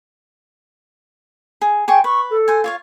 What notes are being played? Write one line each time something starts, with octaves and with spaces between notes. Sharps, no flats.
G#4
G#4 G5 C6 C#6
B4 C#6
A4
C5 G#5
F4 C#5 F5